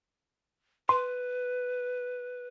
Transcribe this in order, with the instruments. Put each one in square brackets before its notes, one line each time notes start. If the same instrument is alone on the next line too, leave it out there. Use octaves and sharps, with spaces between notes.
[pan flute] B4 [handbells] C6